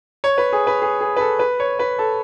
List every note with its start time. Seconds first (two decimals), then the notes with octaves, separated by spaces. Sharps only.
0.24 C#5
0.38 B4
0.53 G#4
0.67 B4
0.82 G#4
1.01 G#4
1.16 B4
1.20 A4
1.39 B4
1.60 C#5
1.79 B4
1.98 A4